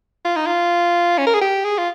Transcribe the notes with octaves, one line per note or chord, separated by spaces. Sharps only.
F4
D#4
F4
C#4
A#4
G#4
G4
G#4
F4